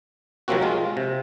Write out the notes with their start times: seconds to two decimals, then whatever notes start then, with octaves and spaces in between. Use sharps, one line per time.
0.48 C3 F3 F#3 A#3 C4 F#4
0.62 G#3 F4
0.97 C3